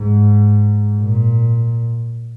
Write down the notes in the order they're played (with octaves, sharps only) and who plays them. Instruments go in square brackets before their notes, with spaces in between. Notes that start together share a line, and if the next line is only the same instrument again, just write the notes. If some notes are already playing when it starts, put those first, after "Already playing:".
Already playing: [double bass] G#2
A#2